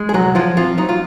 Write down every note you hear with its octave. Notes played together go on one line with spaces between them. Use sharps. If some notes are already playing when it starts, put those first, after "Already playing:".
Already playing: G#3
G#4
C2 F#3 F#4
F3 F#3 F4
F3 C4 F4
F#3 D#4
F4